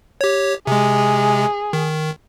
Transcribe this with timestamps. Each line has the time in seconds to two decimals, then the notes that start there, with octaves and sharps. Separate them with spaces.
0.21 G4 C#5
0.67 C3 G#3 G#4
1.73 D#3